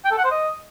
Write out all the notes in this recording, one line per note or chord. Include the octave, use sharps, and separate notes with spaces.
G5
A4
F#5
C5
D#5